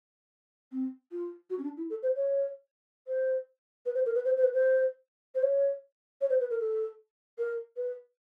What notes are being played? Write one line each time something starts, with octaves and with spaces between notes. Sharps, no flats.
C4
F4
F#4
C#4
D4
E4
A4
C5
C#5
C5
B4
C5
A#4
B4
C5
C5
B4
C5
C5
C#5
C#5
C5
B4
A#4
A4
A#4
B4